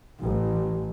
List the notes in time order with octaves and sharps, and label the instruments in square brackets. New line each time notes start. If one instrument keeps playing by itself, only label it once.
[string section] A1